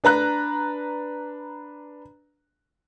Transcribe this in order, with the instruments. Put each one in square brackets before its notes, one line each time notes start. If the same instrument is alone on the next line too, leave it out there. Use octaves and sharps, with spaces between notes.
[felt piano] D4 B4 A#5 F#6